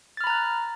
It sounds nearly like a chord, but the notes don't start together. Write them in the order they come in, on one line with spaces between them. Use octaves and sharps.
A6 F6 B5 A#5 F#6